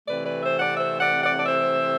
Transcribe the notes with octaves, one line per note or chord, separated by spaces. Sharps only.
C3 E3 A3 C4 B4 D5
B4 D5
C5 E5
D5 F#5
C5 E5
D5 F#5
D5 F#5
D5
C5 E5